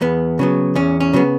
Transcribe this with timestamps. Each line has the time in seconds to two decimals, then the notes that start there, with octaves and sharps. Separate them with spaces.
0.01 E2 B3
0.39 C#3 F#3 B3
0.75 E2 C#4
1.00 C#4
1.13 C#3 F#3 B3